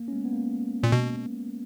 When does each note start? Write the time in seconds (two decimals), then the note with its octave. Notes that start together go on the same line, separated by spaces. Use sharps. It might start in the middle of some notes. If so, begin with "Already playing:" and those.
Already playing: A#3
0.08 C#4
0.13 G#3 B3
0.25 B3
0.33 A#3
0.83 A#2
0.92 B2